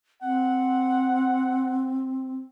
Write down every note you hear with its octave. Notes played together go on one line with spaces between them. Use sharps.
C4 F#5